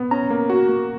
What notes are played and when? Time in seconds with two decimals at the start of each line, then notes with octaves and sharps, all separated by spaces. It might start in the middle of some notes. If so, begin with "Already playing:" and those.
Already playing: B3
0.11 C#4 A#5
0.30 A#3
0.50 F#4
0.69 A#3